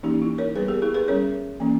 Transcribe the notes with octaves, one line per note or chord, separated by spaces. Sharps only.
E3 A#3 C#4 D#4 G4
E4
A#4 C#5
G3 B3 G#4 B4
G4 A#4
E4 G#4
G#4 B4
G3 C#4 A#4 C#5
E3 A#3 C#4